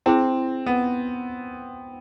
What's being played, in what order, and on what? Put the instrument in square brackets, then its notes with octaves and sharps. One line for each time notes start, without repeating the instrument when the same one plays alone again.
[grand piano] C4 [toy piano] E4 G#4 C5
[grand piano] B3